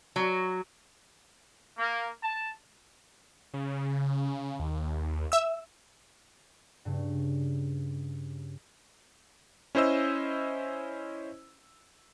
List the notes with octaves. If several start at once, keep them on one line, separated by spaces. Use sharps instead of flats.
F#3
A#3
A5
C#3
D#2
E5 E6
G2 C#3
C#4 E4 C5 D#5 E6